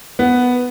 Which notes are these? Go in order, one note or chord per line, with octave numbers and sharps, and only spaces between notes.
B3